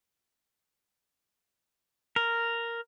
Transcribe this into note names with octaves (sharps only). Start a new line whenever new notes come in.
A#4